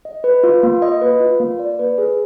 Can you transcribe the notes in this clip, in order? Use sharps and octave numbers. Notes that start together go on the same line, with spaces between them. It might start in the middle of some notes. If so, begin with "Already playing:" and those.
D#5
B4
F4
A#3
D#5
B4
F4
A#3
D5
B4
G#4